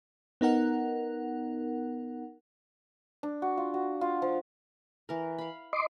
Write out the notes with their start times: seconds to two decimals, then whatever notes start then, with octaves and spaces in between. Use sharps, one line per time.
0.41 B3 D#4 A#4 F#5
3.23 D4
3.42 F#4
3.57 F4
3.74 F#4
4.01 F4
4.22 F3
5.09 E3 A#4
5.38 F5 B5
5.73 D#5 C6 D6